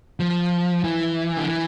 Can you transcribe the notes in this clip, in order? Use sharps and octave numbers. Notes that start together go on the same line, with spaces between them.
F3
E3
D3
E3